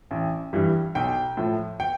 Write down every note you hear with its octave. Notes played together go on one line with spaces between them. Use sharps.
A1
G2 E3 G3
B1 G5
A2 F3
G5